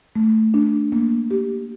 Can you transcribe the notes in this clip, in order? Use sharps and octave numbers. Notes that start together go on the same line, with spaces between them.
A3
D4
A#3
G4